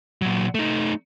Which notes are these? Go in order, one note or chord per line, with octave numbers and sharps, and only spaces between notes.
A#2 F#3
A3 D#4